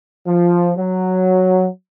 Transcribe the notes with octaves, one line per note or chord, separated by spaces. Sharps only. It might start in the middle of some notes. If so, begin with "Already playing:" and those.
F3
F#3